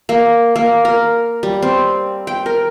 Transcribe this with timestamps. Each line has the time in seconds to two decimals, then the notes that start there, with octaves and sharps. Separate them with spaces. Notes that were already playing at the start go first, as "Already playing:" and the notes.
0.09 A#3
0.56 A#3
0.85 A#4
1.43 G3
1.62 C4
2.27 G5
2.46 A#4